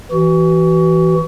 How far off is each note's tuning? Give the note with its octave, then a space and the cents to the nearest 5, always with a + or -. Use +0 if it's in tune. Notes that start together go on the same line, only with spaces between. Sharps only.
E3 +0 F#4 +30